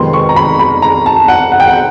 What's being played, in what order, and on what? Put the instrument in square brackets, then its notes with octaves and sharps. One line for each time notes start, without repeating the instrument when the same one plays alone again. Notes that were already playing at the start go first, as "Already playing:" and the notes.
Already playing: [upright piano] F2 C3 D#3 G#3 B3 C6
C#6
A#5
B5
B5
A#5
A5
F#5
F#5
G5
F#5